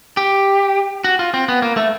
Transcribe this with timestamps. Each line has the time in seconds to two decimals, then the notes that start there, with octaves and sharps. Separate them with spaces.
0.17 G4
1.04 F#4
1.19 F4
1.34 C4
1.49 B3
1.62 A#3
1.77 A3